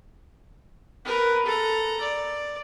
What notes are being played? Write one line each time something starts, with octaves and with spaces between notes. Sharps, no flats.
A#4 B4
A4 A#5
D5